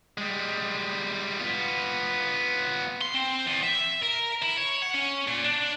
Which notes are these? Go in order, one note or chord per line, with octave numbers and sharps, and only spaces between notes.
G3 G#3
B3 F4
C6
C4
E2
E5
A#4
E4
C#5
F#5
C#4
A#2
D4